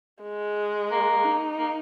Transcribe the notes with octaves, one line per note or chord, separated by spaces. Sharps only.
G#3
A#3
D#4
A#3